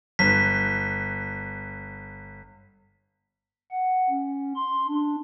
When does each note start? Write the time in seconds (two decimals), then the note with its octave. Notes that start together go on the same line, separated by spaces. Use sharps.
0.19 G1 B6
3.71 F#5
4.10 C#4
4.56 C6
4.88 D4